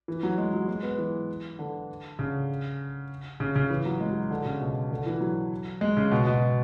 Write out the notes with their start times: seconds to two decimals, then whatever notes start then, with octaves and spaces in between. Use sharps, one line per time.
0.08 E3
0.23 F#3
0.38 G#3
0.53 F#3
0.68 G#3
0.83 B3
0.98 E3
1.59 D3
2.19 C#3
3.40 C#3
3.56 C#3
3.70 E3
3.85 F#3
4.00 G#3
4.11 F#3
4.31 D3
4.46 C#3
4.60 B2
4.91 D3
5.06 E3
5.21 F#3
5.81 G#3
5.97 C#3
6.12 B2
6.27 B2